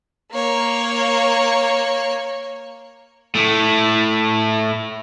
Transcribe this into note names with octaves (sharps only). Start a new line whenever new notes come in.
A#3 C#5
A2 A3